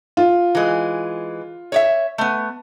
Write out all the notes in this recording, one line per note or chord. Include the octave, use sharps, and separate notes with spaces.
F4
E3 G#3
C#5 D5 E5
A3 B3